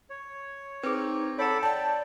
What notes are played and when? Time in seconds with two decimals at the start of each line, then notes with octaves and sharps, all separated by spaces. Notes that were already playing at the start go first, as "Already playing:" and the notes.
0.10 C#5
0.83 C4 D#4 G#4 B4
1.38 A4 C#5 F#5 A#5 B5 D6
1.63 D5 G5 A5